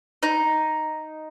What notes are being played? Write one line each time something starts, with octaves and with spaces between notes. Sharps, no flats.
D#4